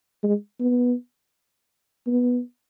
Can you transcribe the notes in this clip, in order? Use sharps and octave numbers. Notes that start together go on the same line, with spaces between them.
G#3
B3
B3